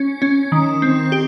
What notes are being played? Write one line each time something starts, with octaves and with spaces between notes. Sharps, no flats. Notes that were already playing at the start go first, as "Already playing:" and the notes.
Already playing: C#4
C#4
D#3
C4
G4